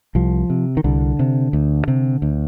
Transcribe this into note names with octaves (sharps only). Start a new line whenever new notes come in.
C2 F3
C3
D#3
C2 D3
C3
D2
C3
D2